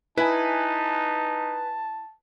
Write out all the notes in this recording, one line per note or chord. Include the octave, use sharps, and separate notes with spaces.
D#4 E4 B4 G#5 A5